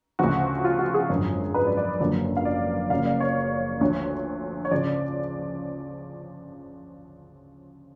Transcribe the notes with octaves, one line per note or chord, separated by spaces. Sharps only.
D2 C#3 F3 F#4
F4
F#4
G#4
G#1 F#2 D3 F3
B4
D5
D5
F#1 F#2 D3 F3
F5
D5
F#1 F#2 C#3 F3 F5
D5
C#5
D2 D3 F3 C#5
C#5
C#3 F3 D5